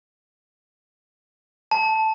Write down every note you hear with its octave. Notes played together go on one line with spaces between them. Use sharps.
A5